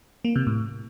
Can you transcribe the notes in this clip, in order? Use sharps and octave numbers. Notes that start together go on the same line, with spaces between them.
A#3
C3
A2